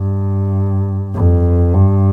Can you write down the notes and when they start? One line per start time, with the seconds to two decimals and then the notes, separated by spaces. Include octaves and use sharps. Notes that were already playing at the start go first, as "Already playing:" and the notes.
Already playing: G2
1.13 F2
1.74 G2